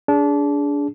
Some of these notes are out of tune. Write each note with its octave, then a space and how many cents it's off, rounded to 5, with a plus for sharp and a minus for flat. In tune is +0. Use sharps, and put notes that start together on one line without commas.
D4 -25 G#4 +0